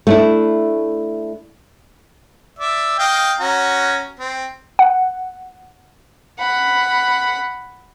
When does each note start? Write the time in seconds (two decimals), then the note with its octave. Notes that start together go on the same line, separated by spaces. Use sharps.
0.07 A3 D4 E4
2.59 D5 E5
2.99 D#5 F5 G5
3.40 C#4 F#4 A#5
4.19 C4
4.79 F#5
6.39 F#5 B5